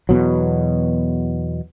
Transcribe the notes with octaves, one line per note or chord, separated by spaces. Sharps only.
E2 B2 F#3